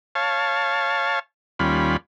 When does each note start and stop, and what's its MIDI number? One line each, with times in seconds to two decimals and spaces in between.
0.15 1.19 73
0.15 1.19 77
0.15 1.19 81
1.59 1.97 39
1.59 1.97 55
1.59 1.97 61
1.59 1.97 65
1.59 1.97 83